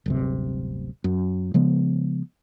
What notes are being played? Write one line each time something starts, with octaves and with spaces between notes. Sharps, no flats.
D1 G1 C3
F#2
C#3 F3 G#3 B3